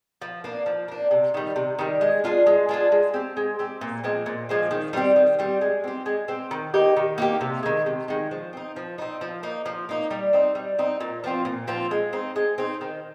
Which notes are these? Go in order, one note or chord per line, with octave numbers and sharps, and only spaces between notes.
F3
A#3 D4
F3
A#3 D4
C3
D#3 G3
C3
D#3 G3
G#3
D4 F4 G#4
G#3
D4 F4 G#4
G#3
C4 G4
G#3
C4 G4
A#2
F3 G#3 C4
A#2
F3 G#3 C4
D#3
G3 C4 G4
D#3
G3 C4 G4
G#3
C4 G4
G#3
C4 G4
D#3
A#3 D#4 G4
D#3
A#3 D#4 G4
C3
D#3 G#3
C3
D#3 G#3
F3
C4 D#4
F3
C4 D#4
F3
A#3 D#4
F3
A#3 D#4
G3
C4 D#4
G3
C4 D#4
A#2
F3 C4 F4
A#2
F3 C4 F4
G#3
C4 D#4
G#3
C4 D#4
D#3